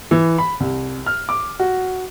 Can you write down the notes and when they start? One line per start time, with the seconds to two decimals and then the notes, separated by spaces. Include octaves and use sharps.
0.11 E3
0.38 B5
0.60 C2
1.06 F6
1.29 D6
1.60 F#4